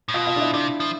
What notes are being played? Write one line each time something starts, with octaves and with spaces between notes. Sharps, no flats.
A2
B2 F4
F4
D4
E4
C3 D4
F3